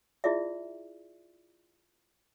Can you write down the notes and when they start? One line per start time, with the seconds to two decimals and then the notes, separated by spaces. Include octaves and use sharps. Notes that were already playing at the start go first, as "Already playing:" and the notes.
0.24 E4 F4 G#4 D5 E5